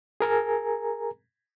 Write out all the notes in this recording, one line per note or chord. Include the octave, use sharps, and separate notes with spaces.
G#4 A#4 G#5 A#5